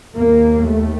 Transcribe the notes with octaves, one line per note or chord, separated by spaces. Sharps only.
D#2 A#3
A3